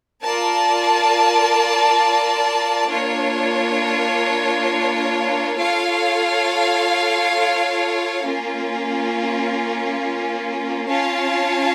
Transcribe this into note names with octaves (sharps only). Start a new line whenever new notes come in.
F4 A#4 D5 A5
A#3 D4 F4 C#5
F4 A4 C#5 F5
A#3 C#4 F4
C#4 F4 C#5 F5 A5